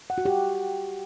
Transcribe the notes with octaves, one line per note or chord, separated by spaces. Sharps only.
F#5
F#4
G4